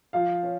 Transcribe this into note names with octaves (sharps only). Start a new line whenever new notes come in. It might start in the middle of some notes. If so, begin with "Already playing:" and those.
F3 F5
C#4